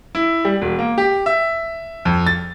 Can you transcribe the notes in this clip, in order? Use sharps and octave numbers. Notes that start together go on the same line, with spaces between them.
E4
G3
E1
A#3
G4
E5
F2
A6